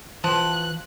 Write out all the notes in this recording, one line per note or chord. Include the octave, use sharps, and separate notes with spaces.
E3 F3 B4 G5 A5 F#6